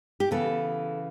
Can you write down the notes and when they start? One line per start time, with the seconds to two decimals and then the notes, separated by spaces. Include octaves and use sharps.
0.20 G4
0.31 C#3 E3 B3 A4